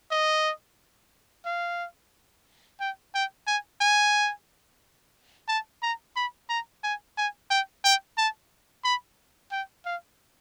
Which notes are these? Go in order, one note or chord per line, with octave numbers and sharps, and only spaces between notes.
D#5
F5
G5
G5
G#5
G#5
A5
A#5
B5
A#5
G#5
G#5
G5
G5
A5
B5
G5
F5